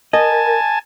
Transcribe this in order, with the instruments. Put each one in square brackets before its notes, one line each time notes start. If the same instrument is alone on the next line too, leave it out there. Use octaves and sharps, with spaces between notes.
[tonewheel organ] A#4 [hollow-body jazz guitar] D#5 [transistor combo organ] G#5 A5